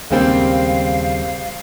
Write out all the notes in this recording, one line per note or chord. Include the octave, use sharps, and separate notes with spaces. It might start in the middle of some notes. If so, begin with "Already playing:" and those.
D#2 C#3 G3 G#3 A#3 C4 F5